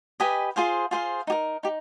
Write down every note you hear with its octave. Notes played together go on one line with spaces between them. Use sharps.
G4 B4 D#5 G#5
F4 G#4 C5 F5
F4 G#4 C5 F5
D#4 G4 A#4
D#4 G4